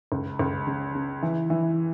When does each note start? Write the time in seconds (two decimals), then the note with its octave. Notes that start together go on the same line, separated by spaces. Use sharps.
0.12 C#2
0.39 C#2
0.67 C#3
0.95 C#3
1.22 E3
1.50 E3